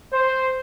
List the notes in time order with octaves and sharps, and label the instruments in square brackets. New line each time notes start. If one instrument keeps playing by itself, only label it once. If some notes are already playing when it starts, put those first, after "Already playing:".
[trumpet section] C5